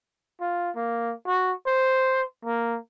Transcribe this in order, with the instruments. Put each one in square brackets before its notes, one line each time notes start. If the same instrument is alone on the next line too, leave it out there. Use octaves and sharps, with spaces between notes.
[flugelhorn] F4
A#3
F#4
C5
A#3